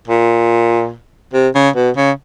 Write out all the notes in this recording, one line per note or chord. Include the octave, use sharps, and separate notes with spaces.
A#2
C3
C#3
B2
C#3